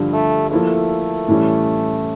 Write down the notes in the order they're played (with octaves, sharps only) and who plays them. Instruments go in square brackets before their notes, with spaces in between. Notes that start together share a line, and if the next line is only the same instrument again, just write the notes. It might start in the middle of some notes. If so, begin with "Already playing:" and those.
Already playing: [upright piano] G2 D3 F3
[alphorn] A3
[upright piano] F3 A#3 E4 A4 [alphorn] A3
[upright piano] A2 E3 G3 C#4